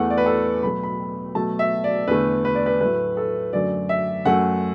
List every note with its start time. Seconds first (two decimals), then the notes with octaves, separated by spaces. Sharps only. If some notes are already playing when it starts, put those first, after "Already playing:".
Already playing: E2 E3 A3 F#5
0.10 D5
0.18 B4
0.26 A4
0.63 B2 F#3 A3 B5
0.83 B5
1.35 B2 F#3 A3 A5
1.59 E5
1.84 D5
2.08 E2 D3 A3 B4
2.45 B4
2.55 D5
2.66 B4
2.80 A2 F#3 A3 B4
3.17 A4
3.53 F#2 D3 F#3 A3 D5
3.89 E5
4.25 F#2 F#3 A3 F#5